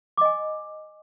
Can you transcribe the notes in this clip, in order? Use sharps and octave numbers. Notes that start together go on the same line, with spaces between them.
D#5 G#5 D6